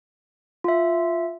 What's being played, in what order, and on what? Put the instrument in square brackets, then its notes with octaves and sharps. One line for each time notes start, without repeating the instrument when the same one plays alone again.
[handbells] F4 E5